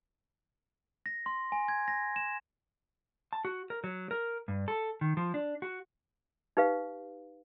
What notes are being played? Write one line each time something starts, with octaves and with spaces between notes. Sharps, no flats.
A#6
C6
G#5
G#6
A#6
E7
A5
F#4
A#4
F#3
A#4
G2
A4
D#3
F3
D4
F#4
D#4 G4 B4 F5